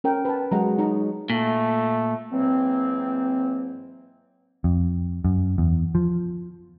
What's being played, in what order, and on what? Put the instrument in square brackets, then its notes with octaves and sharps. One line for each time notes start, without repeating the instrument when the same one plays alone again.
[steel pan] C#4 A#4 G5
B4 A5
[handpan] F#3 G#3 [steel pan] G#4 F#5 A#5
[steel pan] D#4 D#5 A#5
[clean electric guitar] A#2 [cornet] A3
[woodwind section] G#2 E3 F#3 A#3 C4
[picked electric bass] F2
F#2
E2
F3